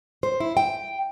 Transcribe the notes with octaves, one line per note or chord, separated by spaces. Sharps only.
C5
E4
G5